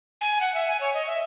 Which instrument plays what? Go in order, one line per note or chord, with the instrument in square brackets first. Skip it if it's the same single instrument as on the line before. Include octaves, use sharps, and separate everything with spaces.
[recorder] G#5
F#5
E5
G#5
C#5
D#5
E5